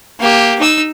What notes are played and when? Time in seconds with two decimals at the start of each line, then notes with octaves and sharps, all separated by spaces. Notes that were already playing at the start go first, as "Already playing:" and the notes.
0.20 A#3 G4
0.60 D#4 E6